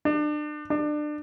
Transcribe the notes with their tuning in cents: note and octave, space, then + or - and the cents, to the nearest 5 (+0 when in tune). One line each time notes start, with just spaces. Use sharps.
D4 +35
D4 +30